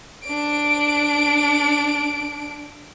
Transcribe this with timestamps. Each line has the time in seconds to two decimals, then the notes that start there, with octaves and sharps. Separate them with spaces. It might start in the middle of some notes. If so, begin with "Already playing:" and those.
0.24 D4 D7